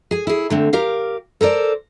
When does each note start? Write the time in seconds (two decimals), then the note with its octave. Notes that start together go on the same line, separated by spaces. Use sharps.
0.11 G#4 G#5
0.27 E4 G#4
0.50 D3 A3 C4
0.73 G4 A#4 F5
1.41 A4 A#4 C5 D5